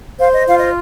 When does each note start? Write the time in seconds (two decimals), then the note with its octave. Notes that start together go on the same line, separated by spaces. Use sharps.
0.19 C5 F5
0.33 D#5
0.46 F4 F5
0.60 D#5